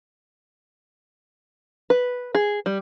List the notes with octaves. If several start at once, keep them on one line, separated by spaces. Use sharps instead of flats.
B4
G#4
G3